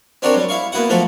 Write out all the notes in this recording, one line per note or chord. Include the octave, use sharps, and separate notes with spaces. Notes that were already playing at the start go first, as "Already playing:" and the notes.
C4 D4 F#4 G4 A#4 C#5
F#3 G3
E4 E5 F5 C#6
A#3 B3 E4 F#4 F#5
F3 F#3 A3 F#4 A4